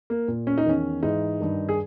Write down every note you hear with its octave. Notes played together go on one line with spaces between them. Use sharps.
A#3
A#2
C#4
D#4
E2 D#3 C#4
G#2 E3 D#4
G2 D#3
G#4